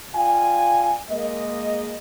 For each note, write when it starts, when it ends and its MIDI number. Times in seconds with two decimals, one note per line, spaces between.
0.15 0.93 65
0.15 0.93 74
0.15 0.93 77
0.15 0.93 79
0.15 0.93 80
1.11 1.97 56
1.11 1.97 58
1.11 1.97 75